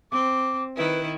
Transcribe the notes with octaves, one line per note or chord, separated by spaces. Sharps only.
C4 D6
D#3 E4 B4